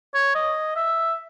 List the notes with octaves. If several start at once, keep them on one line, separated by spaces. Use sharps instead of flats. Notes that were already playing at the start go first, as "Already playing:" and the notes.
C#5
D#5
E5